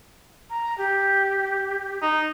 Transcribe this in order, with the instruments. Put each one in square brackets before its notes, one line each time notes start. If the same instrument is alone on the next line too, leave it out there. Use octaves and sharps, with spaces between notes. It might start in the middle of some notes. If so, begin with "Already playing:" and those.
[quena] A#5
G4
[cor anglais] D#4